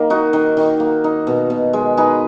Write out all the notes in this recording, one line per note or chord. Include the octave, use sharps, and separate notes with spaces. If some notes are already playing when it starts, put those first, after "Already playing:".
Already playing: D#3 A#3 A#4
D#4 F#4
D#3
D#3
A#3
D#4
B2
B2
G#3
D#4 G#4 B4